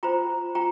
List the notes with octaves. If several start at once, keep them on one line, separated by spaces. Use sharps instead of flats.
F4 C5 G5 A#5
F4 G5 A#5